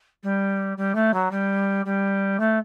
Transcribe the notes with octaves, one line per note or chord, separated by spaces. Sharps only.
G3
G3
A3
F#3
G3
G3
A3